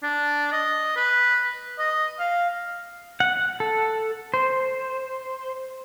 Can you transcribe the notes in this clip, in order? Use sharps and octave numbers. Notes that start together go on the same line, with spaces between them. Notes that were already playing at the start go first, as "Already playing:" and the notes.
D4
D#5
B4
D#5
F5
F#5
A4
C5